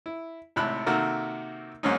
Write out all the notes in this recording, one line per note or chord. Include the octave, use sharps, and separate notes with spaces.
E4
G#1 A2 C3 B5 F#6
C3 D#3 A#3 F#4 A4 A#4
G#2 F#3 A#3 C4 C#4 D#4